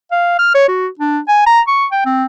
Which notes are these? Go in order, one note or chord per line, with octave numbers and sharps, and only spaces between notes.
F5
F6
C#5
F#4
D4
G#5
A#5
C#6
G5
C4